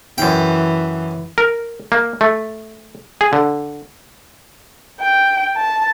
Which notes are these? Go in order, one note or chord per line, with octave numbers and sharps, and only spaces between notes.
F#2 E3 G5
A#4
A#3
A3
G#4
D3
G5
A5